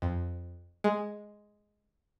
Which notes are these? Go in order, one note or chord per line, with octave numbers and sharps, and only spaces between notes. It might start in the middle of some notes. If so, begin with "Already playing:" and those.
F2
G#3